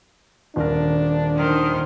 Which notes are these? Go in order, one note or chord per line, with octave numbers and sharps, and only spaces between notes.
D#1 D4 A#4
D#3 C5